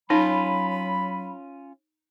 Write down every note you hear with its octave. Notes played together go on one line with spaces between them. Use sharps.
F#3 C#4 D#4 F4 B5